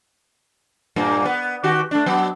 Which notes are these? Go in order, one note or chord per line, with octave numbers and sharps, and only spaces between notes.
G2 A#2 A#3
B3
D#3 F#4 G4
A3 D4
F#3 B3